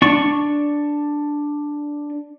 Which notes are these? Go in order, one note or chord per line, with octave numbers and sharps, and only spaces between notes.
D4 C#6